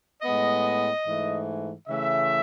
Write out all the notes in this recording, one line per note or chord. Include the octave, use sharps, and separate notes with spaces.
A2 G#3 B3 D#5
G#2 E3 A3
C#3 E3 A3 E5